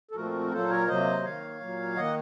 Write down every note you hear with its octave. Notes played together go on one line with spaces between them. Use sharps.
A4
A#2 F3 A3 C4 F#4 A#4
A#2 F#3 A#3 A4 C5
A#4 C#5
C3 F#3 A#3 C5 D#5
D#3 A#3 C#5 F5
A#2 F#3 A#3
D#3 A#3 D#5 F#5